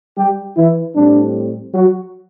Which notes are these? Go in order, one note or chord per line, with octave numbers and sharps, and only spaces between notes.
G3 G4
E3 E4
A2 G3 C4 D4
F#3 F#4